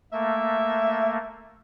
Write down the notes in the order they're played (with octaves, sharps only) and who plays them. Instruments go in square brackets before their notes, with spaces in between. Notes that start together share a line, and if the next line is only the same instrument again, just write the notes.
[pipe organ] A3 A#3 [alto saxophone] E5